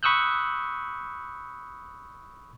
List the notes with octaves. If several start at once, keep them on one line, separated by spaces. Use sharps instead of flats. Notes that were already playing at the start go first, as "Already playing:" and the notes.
B5 C#6 D#6 E6 F#6 G6